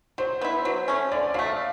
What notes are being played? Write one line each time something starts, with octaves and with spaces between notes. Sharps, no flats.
F#3 C5
B3 E4
F#3
A3 C#4
D3 D5
F#3 A3 F5